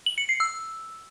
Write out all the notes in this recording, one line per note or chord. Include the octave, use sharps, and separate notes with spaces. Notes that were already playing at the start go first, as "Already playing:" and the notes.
F#7
C#7
C7
E6